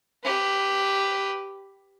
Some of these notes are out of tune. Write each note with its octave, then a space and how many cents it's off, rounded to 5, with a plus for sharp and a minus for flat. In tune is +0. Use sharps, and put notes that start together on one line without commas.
G4 +0 B4 +10